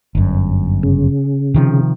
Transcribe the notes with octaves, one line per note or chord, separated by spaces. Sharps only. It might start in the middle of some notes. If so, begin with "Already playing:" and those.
G1 F#2
C#3
C3 D#3 F3